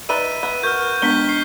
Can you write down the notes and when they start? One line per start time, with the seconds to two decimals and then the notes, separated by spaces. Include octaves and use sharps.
0.09 D#4 B4 D5 E5 D#7
0.43 B3
0.63 F#4 A#4 F6 G6
1.02 D#3 G#3 B3 D4 B6 G7
1.29 C#6 C7